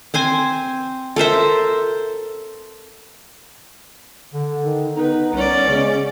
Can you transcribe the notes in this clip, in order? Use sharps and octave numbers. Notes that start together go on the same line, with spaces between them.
C4 C5 G#5
A4 A#4 C5 E5
D3
D#3
B3 D#4 B4
C2 C#4 D5
C#3 G#3